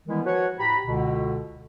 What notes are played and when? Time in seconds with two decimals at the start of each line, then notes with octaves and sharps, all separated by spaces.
0.07 D#3 E3 G3 G#3 B3 E4
0.25 F3 F#4 B4 C#5
0.58 A2 G4 A#5 B5
0.85 C#2 B2 D3